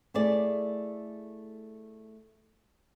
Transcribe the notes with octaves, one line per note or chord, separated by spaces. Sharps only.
A3 E4 G#4 D5